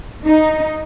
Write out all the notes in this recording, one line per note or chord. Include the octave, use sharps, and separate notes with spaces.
D#4